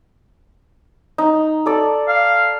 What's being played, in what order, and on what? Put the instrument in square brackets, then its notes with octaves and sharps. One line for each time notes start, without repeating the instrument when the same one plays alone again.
[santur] D#4
A4 D5
[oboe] F5